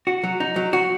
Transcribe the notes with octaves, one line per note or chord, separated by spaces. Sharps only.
F#4
F#3
D#4
F#3
F#4